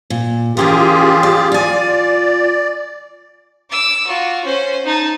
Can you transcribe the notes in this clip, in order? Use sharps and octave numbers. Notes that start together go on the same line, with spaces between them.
A#2
E3 C#4 F4 G4 G#4 A#4
D5
F4 D5 G#5
D6 E6
F4 F#4
C#4 C5
D#4 A5